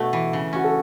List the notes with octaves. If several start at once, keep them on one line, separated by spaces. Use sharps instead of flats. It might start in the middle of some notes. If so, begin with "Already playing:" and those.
Already playing: B2 A3 F#4 A4
E3
C#3
C#4 F#4
A4